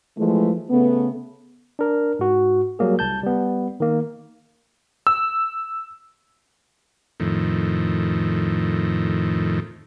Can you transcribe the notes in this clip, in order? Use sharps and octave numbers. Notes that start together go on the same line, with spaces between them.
E3 F3 G#3 A3
C#3 A3 B3
D4 A#4
G#2 F#4
F#3 G3 A#3 G#4
C2 A5 G6
G3 B3
D#3 A#3
E6
F2 A2 D#3